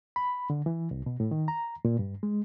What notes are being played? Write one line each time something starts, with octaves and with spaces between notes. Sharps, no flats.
B5
D3
E3
C2
B2
A2
D#3
A#5
A#2
G2
G#3